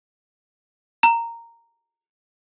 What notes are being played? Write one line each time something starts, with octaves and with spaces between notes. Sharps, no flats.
A#5